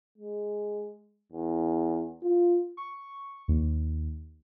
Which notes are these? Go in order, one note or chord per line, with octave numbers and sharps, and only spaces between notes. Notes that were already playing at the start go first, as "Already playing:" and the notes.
G#3
E2
F4
C#6
D#2